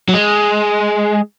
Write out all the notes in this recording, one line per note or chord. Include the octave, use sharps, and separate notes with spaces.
F#3
G#3